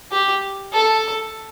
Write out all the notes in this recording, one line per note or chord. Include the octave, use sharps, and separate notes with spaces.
G4
A4